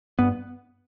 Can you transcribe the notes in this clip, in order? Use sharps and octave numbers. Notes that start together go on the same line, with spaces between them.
G2 B3